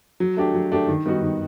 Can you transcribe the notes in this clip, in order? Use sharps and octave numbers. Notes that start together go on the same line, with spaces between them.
F#3
A3 D4 G4
F#3
A3 D4 G4
D#3
G3 B3 D#4 F#4
D#3